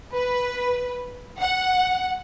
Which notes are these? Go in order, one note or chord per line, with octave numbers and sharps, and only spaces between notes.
B4
F#5